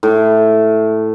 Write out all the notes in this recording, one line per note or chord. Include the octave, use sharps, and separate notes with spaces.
A2